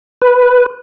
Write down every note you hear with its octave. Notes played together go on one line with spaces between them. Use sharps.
B4